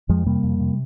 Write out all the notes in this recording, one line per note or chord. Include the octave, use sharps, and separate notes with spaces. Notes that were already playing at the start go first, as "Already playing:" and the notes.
F2 F3 G#3
C3 G3 A#3
F2
C3